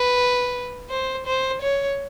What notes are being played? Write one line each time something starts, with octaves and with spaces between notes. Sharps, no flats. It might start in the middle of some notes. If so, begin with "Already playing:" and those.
Already playing: B4
C5
C5
C#5